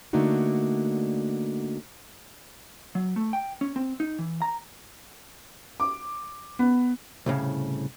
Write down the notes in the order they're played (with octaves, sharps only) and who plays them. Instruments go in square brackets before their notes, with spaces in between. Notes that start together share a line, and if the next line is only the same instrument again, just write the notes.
[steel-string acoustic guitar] D3 A3 A#3 D4 D#4 F#4
[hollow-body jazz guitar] F#3
A3
G5
C#4
C4
D#4
E3
A#5
[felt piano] D6
B3
[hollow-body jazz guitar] C2 A2 C#3